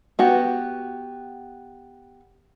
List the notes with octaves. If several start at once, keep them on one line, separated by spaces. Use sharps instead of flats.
B3 F#4 G4